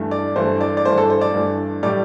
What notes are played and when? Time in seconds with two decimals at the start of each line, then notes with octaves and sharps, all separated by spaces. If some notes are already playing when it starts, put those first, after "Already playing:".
Already playing: G2 E3 A3
0.11 D5
0.36 G2 E3 A3 C5
0.61 D5
0.77 D5
0.85 G2 E3 A3 C5
0.98 A4
1.10 C5
1.21 D5
1.34 G2 E3 A3
1.83 A2 G3 D5